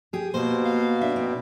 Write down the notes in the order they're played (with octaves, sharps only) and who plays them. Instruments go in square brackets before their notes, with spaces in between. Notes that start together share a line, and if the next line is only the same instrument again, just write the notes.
[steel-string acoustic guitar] G4 G#4
[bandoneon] B2 [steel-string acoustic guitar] A#3 [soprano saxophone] C5
[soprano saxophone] F5
[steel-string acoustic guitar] D4 [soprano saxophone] E5
[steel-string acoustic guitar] C4 [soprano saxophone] D#4